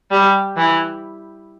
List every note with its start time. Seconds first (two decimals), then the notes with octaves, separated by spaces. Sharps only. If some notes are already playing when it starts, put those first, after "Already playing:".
0.11 G3
0.57 E3